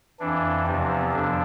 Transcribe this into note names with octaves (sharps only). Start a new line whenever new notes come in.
F2 E3 D4
E2 C3 F3 C4
F2 D3 F3 D4